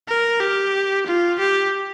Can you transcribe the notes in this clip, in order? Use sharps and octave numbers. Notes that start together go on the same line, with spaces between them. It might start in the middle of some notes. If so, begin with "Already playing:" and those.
A#4
G4
F4
G4